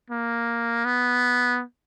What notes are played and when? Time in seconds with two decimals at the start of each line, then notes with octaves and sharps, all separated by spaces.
0.11 A#3
0.85 B3